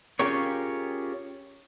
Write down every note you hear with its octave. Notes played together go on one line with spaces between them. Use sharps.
C#4 F4 G4 G#4 A#4 C#5